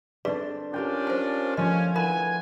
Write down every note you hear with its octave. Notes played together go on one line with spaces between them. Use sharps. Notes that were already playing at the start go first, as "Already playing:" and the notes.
C4 D4 G#4 A4 B4 D5
C#4 D4 F4 G4 A#4 G5
C5 G#5
F3 A3 C#4 D#5
E3 A#4 F#5 G#5 B5